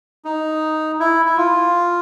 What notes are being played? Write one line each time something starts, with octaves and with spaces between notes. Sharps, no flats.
D#4
E4
E4
F4